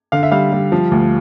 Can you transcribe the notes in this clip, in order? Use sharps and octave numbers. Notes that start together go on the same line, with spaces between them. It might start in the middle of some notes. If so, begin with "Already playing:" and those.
D3 F5
E5
G3 F5
G3
F3
D2